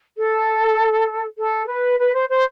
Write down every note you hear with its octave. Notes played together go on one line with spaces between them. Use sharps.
A4
A4
B4
B4
C5
C5